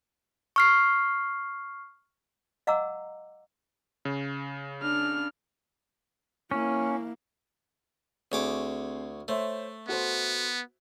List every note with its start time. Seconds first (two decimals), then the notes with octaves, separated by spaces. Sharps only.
0.56 C#6 F6 C7
2.67 D#5 F5 F#5 A#5 D6 E6
4.05 C#3
4.82 D4 F6
6.51 A#3 C#4 E4
8.32 D2 C4 G#4 C#5 D6
9.28 A3 C5 C#5 E5
9.89 B3 F#4 A4 C5